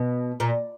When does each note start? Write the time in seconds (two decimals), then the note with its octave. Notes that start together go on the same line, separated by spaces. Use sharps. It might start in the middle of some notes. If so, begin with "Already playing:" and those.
Already playing: B2
0.40 A#2